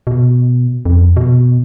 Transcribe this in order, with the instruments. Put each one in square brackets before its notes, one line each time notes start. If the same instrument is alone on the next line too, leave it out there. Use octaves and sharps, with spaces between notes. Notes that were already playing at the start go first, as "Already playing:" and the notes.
[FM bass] B2
F2
B2